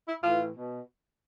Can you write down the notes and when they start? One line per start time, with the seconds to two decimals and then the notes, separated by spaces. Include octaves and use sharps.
0.08 E4
0.24 A2 E3 F4
0.56 B2